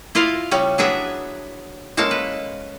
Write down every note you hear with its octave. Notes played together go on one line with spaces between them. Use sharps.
E4 F4 D5 D#5 F5
C#3 G3 C#4
F#3 B3 D4 G#4 E5
G#3 A#3 C#4 A4 A5
B4